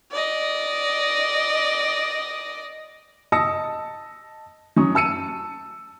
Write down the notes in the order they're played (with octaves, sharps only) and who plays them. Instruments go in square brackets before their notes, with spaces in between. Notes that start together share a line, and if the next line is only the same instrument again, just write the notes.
[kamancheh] D5 D#5
[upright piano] D#5 A5 D#6 E6 A#6 C#7
F#3 C#4 C#6 D#6
A5 E6 C#7 D#7